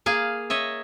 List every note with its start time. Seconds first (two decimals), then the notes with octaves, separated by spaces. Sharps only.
0.06 A#3 G#4 F5
0.50 C#5 D#5 E5